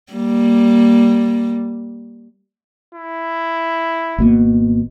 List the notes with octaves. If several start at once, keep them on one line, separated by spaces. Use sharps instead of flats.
G3 A#3
E4
G#1 B2 A#3